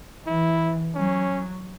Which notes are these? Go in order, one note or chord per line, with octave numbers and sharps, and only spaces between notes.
E3 E4
F#3 C#4